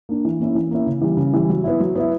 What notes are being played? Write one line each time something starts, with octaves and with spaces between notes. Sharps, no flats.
A#3 D4
E3
A#3 C#4 E4
E3
A#3 C#4 E4
C#3
E3 G3
C#3
E3 G3
F#3
B3 E4
F#3
B3 E4